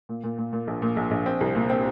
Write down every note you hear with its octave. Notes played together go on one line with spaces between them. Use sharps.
A#2
A#2
A#2
A#2
A#1
A#2
A#1
A#1
C4
C2
A#2
C4